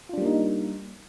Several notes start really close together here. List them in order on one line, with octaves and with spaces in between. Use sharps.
F4 D4 G3 A#3 D#4